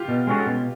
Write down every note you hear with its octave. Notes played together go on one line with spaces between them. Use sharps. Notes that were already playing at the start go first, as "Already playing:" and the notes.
Already playing: F4 G4
B2
G#3 C#4 F#4 A4
B2